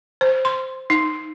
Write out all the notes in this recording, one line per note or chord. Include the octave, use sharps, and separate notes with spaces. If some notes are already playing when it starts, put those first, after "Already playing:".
C5
C6
D#4